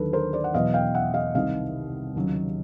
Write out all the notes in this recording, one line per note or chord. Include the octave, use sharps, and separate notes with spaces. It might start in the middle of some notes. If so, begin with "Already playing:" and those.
Already playing: D#2 D3 F#3 A4 B4
A#4 C5
C5 D5
F#5
E2 B2 F#3 D#5 F5
F5 G5
E5 F#5
D#5 F5
C2 C3 D#3 D#5 F5
D#2 C#3 F#3